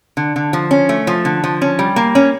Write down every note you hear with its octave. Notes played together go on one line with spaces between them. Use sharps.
D3
D3
F3
C#4
A3
F3
D3
F3
C#4
G3
A#3
C#4